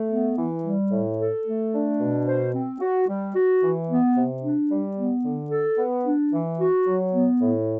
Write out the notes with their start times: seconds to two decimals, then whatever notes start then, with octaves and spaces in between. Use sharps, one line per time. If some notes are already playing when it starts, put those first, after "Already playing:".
Already playing: A3
0.10 B3
0.37 E3
0.64 G3
0.91 A2
1.19 A4
1.46 A3
1.73 D4
1.99 B2
2.27 C5
2.54 C4
2.81 F#4
3.08 G3
3.35 F#4
3.62 E3
3.89 B3
4.16 C3
4.43 D4
4.71 G3
4.97 B3
5.24 D3
5.51 A4
5.78 B3
6.05 D4
6.33 E3
6.59 F#4
6.86 F#3
7.13 B3
7.41 A2